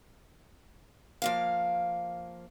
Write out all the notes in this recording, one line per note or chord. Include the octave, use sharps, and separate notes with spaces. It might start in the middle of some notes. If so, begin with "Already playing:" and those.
F3 A#3 F5